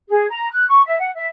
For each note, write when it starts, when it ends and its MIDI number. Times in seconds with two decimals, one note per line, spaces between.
0.09 0.28 68
0.30 0.49 82
0.51 0.67 90
0.68 0.82 85
0.86 0.96 76
1.00 1.10 78
1.15 1.27 76